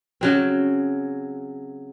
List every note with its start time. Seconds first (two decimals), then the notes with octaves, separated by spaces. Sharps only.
0.21 C#3 F#3 C4